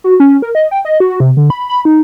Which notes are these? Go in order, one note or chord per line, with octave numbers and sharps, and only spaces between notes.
F#4
C#4
A#4
D#5
G5
D#5
F#4
C3
D3
B5
B5
D#4